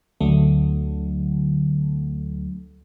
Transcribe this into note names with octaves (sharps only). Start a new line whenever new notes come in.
D2 D3 F#3 A3